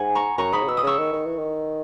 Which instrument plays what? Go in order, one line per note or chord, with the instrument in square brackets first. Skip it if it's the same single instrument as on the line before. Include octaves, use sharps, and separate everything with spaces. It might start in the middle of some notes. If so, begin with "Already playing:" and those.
Already playing: [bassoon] G#2 [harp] F#5 G#5
[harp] A#5 C#6
[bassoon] F#2 [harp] A#5 C#6
[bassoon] G#2 [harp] B5 D#6
[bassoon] C#3
[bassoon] B2 [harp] E6
[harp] D#6
[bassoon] C#3 [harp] C#6 E6
[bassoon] D#3
D#3
E3
D#3